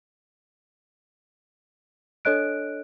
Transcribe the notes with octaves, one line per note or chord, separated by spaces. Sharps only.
D4 A4 C#5 D#5 F#6 D7